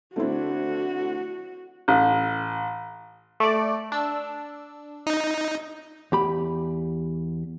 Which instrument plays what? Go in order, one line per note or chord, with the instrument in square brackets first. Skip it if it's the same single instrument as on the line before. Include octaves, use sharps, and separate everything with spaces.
[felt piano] D3 D4 [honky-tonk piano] A3 C4 E4 [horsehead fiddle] F#4
[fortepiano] A1
[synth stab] A3 D5
D4 E6
[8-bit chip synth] D#4
[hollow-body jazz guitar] E2 G4 B5